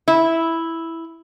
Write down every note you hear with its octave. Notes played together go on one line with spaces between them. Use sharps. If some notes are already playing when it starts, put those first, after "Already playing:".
E4